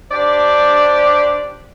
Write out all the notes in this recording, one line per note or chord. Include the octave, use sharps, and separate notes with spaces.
D4 G4 C5 D5